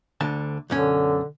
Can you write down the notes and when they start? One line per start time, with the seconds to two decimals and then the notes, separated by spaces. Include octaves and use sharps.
0.21 D2 D3 A5
0.70 B1 F#2 D3 C#4